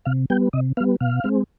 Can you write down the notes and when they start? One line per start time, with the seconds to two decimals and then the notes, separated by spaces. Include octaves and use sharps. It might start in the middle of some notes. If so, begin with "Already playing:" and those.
0.05 C3 F5
0.30 G3 B3 G5
0.53 C3 D#5
0.77 B3 F5
0.80 G3
1.01 B2 F5
1.24 G#3 C4